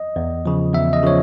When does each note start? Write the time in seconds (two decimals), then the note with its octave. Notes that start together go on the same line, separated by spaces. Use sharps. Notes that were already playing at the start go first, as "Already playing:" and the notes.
Already playing: D#5
0.16 E2
0.46 C#3 F3
0.73 E2 E5
0.93 D#5
1.03 C#3 F3 C#5